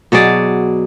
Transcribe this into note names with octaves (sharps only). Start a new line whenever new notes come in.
B2 F#3 G#4 D5